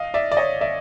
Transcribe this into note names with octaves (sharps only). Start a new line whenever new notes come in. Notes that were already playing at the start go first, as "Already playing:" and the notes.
Already playing: D#5 F5
D5 E5
D5
C#5 D#5
D5 E5